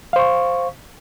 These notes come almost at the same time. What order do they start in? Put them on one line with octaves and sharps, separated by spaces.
F5 C5 C#6